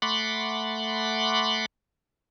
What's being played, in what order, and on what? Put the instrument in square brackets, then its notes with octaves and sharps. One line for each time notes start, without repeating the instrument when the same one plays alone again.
[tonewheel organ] A3 F#5 B5 C6 D6